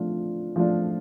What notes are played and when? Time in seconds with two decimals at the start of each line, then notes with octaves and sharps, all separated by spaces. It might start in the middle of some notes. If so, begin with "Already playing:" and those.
Already playing: F3 A3 D4 F4
0.56 F3 A3 D4 F4